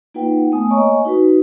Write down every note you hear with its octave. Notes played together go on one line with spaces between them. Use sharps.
A#3 D#4 F4 B4 F#5 G5
A3 B3 G#5 D#6
A#3 C#5 D#5 G#5 A#5 C#6
D#4 F#4 B4